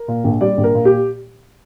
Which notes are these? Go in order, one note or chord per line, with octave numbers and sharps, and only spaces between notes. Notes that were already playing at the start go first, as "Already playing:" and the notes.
Already playing: A#4
A#2
A#1
G3 D5
A#1
A#4
A#2
G4